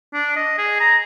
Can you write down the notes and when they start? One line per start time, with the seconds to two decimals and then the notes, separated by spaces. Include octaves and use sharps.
0.14 D4
0.36 D#5
0.58 G#4
0.80 A#5